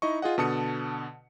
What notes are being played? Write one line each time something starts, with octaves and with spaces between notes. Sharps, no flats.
D#4 E4 D#5 C#6
F4 G#4 D#5 F#5
B2 D3 A5 D#6 C#7